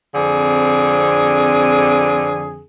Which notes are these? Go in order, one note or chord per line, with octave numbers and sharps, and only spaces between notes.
F2 D3 C4 G#4